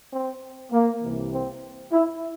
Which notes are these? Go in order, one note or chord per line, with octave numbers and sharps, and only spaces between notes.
C4
A#3
C2 C3 E3
C4
E4